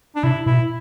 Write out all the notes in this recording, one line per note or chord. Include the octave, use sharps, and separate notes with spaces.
D4
C3 E4
B2 E4